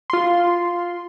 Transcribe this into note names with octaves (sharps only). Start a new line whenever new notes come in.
F4 C6